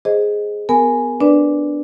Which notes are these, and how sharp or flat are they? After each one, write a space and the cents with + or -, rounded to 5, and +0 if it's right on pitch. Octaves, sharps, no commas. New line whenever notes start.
G#4 +0 C5 +0 D#5 +0
B3 +20 A#4 +0 G#5 +0
D4 +0 B4 +0 D5 +0